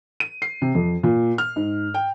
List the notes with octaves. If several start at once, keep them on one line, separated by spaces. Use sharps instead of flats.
D#7
C7
C3
F2
A#2
F6
G#2
G5